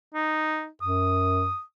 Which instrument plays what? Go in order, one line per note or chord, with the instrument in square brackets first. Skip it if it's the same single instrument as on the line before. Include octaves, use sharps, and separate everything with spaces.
[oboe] D#4
[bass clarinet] F#2 [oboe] D#6